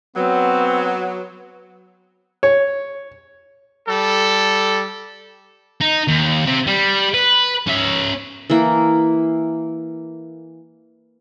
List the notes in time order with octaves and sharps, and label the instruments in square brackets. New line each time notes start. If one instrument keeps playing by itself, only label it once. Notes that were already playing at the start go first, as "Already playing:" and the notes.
[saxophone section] F#3 [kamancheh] B3 [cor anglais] C4
[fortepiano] C#5
[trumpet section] G3 A4
[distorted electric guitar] D#4
D#2
C3
G3
B4
C#4 E5
[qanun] E3 A#3